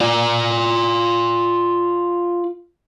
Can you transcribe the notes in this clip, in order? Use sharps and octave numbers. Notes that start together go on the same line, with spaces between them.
F4 D5